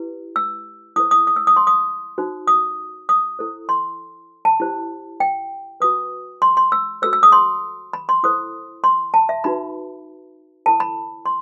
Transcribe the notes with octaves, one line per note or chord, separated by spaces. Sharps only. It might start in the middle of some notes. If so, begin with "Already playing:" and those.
Already playing: E4 G4 B4
E6
E4 A4 C5 D#6
D#6
D#6
E6
D#6
C6
D#6
D#4 F#4 C5
D#6
D#6
E4 A4 C5
C6
A5
E4 G4 C5
G5
F#4 B4 D#6
C6
C6
E6
F#4 A4 C5 E6
E6
D#6
C6
B5
C6
E4 A4 C5 D#6
C6
A5
E5
D#4 F#4 B4 B5
E4 A4 C5 A5
B5
C6